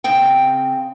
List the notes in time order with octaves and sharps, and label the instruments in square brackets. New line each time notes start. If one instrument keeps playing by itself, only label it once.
[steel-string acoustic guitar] C#3 C4 G5